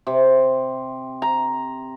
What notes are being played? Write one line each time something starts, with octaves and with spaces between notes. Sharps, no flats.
C3
A#5